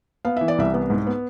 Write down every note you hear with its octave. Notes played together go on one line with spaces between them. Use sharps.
B3 F5
E3 E5
D5
C2 E5
B3
G#2
B3